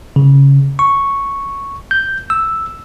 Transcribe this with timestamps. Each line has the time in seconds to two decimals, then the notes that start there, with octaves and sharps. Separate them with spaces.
0.16 C#3
0.79 C#6
1.91 G6
2.30 E6